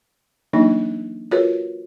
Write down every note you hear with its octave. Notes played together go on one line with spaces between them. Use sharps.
E3 F#3 A#3 D4 D#4
F4 F#4 G#4 A#4 B4 C#5